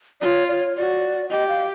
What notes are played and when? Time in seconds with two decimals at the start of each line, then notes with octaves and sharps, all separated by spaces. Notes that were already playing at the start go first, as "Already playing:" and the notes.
0.21 F4 C#5 D5
0.48 D5
0.53 C#5
0.77 F#4 D5
1.30 G4 D#5
1.48 F5